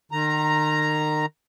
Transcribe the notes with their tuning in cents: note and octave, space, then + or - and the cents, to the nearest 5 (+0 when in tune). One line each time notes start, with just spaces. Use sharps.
D#3 -35 A#5 +0